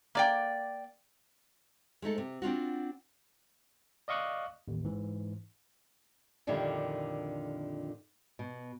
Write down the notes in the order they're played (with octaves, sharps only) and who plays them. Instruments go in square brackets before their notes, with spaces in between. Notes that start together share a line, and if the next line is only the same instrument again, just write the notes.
[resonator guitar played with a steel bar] A#3 D5 G5
[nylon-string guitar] G#3 A3 D#4 A4
C3
C4 D4 F4 F#4
[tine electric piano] D5 D#5 F5 C#6 D#6 F#6
A1 D#2
G#2 E3
[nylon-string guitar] F2 A#2 D3 D#3 G3 E4
B2